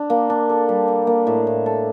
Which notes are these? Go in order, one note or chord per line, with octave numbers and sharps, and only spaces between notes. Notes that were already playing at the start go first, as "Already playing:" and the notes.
Already playing: D4
A#3
D4
A4
G3
D4
A#3
A2
A2
A4